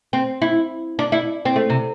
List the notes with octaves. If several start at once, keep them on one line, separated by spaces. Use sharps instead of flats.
C4
E4
D4
E4
C4
A3
C3